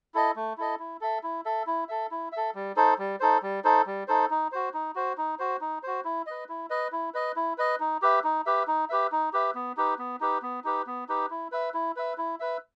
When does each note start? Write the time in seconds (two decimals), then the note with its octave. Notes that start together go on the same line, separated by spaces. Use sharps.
0.14 E4 A4 D#5
0.36 A3
0.58 E4 A4 D#5
0.79 E4
1.01 A4 E5
1.23 E4
1.45 A4 E5
1.67 E4
1.89 A4 E5
2.11 E4
2.32 A4 E5
2.55 G3
2.76 D#4 A4 C5
2.98 G3
3.20 D#4 A4 C5
3.42 G3
3.64 D#4 A4 C5
3.86 G3
4.08 D#4 A4 C5
4.30 D#4
4.52 F#4 C5
4.74 D#4
4.95 F#4 C5
5.18 D#4
5.39 F#4 C5
5.61 D#4
5.83 F#4 C5
6.05 E4
6.27 B4 D#5
6.49 E4
6.70 B4 D#5
6.92 E4
7.14 B4 D#5
7.36 E4
7.58 B4 D#5
7.80 D#4
8.02 G4 B4 E5
8.24 D#4
8.46 G4 B4 E5
8.67 D#4
8.90 G4 B4 E5
9.12 D#4
9.33 G4 B4 E5
9.55 B3
9.77 D#4 G4 B4
9.99 B3
10.20 D#4 G4 B4
10.42 B3
10.64 D#4 G4 B4
10.87 B3
11.09 D#4 G4 B4
11.30 E4
11.52 B4 E5
11.74 E4
11.96 B4 E5
12.18 E4
12.40 B4 E5